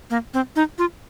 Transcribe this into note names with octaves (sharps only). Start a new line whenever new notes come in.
A#3
C4
D#4
F4